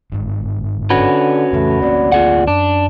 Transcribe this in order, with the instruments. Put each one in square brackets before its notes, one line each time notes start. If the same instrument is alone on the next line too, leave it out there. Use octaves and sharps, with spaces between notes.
[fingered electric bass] G1 G#2
[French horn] D3 [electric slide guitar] C#4 F#4 B4
[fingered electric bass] F2 C#3 E3 [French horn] A3
[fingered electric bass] D2 A#3 C4 [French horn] D5
[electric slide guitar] F4 G#4 F#5
[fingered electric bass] F#2 [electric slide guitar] D4